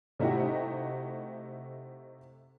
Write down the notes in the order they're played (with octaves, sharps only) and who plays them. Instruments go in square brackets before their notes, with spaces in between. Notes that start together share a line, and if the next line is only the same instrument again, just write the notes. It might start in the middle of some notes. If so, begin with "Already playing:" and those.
[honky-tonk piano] C3 A3 D#4 E4 F#4 G4